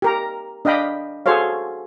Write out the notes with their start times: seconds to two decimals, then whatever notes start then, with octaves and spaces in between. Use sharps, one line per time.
0.02 G4 A#4 A#5
0.65 D4 D#5 F5 G5 B5
1.26 F#4 G#4 A4 C5 C#5 F5